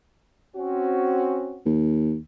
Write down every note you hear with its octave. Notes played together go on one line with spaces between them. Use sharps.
C4 C#4 F#4
D#2